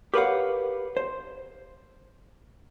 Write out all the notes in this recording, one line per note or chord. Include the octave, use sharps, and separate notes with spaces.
G4 A#4 B4 C#5 F5 F#5
C5